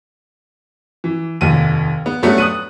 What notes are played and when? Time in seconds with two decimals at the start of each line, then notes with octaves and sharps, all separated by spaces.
1.04 E3
1.41 F1 D#2 D#7
2.06 B3
2.23 F#3 G3 A3 B3 C#4 D4
2.38 D#6 F#6 D#7